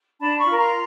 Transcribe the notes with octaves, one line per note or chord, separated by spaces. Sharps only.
D4 A5 B5
B5 C#6
F4 A#4
A#5 C6